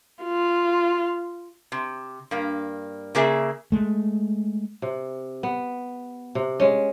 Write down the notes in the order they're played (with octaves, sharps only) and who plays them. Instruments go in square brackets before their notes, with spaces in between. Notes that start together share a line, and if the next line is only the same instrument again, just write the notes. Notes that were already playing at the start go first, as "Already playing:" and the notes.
[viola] F4
[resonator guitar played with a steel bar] C3
G2 A#3
C#3 A#3 G#4 E5
[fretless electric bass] G#3 A3
[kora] C3
B3
C3
G#3 C#4